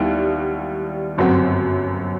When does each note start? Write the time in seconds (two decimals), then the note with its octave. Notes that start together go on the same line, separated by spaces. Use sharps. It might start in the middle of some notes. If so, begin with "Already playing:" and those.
Already playing: D#2 D#3 G3 B3 E4
1.18 G1 F#2 F#3 C4 F#4